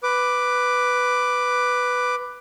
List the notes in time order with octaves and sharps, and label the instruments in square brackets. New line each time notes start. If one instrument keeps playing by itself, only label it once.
[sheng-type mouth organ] B4 D6